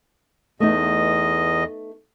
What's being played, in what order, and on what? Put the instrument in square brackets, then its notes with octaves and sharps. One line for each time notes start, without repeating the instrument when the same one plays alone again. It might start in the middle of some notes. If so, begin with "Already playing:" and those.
[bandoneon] E2 D#5 [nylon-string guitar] A3 B3 D#4